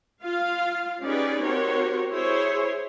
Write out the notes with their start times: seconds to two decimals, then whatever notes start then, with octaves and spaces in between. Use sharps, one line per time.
0.23 F4 F5
1.03 C#4 D#4 G4 G#4 B4 D5
1.42 C4 F#4 G4 A#4 C#5
2.12 E4 G#4 C5 C#5